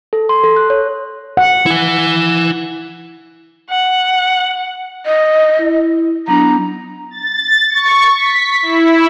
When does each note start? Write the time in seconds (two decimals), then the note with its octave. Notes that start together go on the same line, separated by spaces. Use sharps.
0.13 A4
0.29 C6
0.44 A4
0.56 F#6
0.70 C#5
1.37 F#5
1.66 E4 G#5
3.70 F#5
5.05 D#5
5.59 E4
6.28 F#3 B3 D4 A#5
7.11 A6
7.70 C#6
8.16 B6
8.62 E4